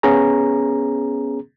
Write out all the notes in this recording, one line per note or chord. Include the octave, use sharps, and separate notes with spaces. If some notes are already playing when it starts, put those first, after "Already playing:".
B3 C#4 G#4 A#5